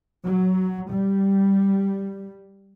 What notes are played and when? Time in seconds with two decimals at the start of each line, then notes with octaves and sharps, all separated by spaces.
0.25 F#3
0.90 G3